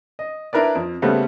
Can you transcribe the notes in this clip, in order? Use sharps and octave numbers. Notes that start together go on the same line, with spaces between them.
D#5
D4 E4 A#4 B4 D5
F2
C#3 G3 A3 B3 C4